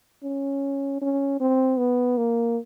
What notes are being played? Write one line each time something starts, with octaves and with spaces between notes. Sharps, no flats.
C#4
C#4
C4
B3
A#3